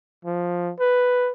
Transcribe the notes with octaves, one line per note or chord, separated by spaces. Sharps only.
F3
B4